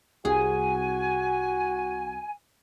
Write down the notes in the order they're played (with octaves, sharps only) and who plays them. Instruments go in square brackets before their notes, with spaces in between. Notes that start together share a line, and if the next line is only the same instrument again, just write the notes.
[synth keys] C2 [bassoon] F#4 [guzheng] G#4 [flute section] G#5